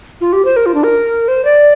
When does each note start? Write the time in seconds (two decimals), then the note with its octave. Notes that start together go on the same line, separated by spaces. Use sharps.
0.21 F4
0.33 G4
0.45 C5
0.56 A#4
0.66 F4
0.74 D4
0.84 A#4
1.28 C5
1.45 D5